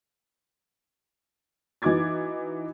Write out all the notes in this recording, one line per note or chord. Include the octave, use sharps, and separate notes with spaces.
E3 D#4 F#4 D6 G#6 A6